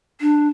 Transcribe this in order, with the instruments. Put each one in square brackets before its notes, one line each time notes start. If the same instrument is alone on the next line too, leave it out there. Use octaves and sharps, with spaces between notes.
[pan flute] D4